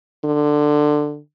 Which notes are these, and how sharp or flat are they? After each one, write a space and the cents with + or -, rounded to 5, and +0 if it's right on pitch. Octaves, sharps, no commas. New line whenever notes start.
D3 +15